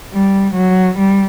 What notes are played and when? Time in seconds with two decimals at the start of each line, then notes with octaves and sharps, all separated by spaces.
0.14 G3
0.55 F#3
0.98 G3